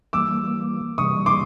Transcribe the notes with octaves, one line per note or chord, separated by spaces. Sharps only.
E3 G3 A#3 D6 E6
C3 E3 G3 C#6 D#6
C6 D6